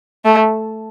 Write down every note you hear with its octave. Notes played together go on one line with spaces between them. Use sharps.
A3